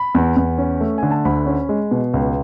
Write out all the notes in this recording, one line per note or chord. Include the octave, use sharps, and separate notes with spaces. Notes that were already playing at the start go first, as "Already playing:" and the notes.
Already playing: B5
E2
E2
C#4
A3
D3 G#5
A5
D2 B5
C#4
G#3
B2
C#2